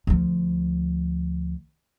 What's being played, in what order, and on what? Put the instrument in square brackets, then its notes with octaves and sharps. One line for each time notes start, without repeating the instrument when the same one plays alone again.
[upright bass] D2 F3